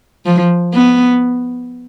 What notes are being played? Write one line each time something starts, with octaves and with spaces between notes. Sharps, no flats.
F3
B3